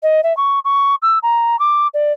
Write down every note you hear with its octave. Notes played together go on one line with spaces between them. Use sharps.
D#5
E5
C#6
C#6
E6
A#5
D6
D5